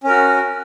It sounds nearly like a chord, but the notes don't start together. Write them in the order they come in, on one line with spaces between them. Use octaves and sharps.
C#4 A#4 F#4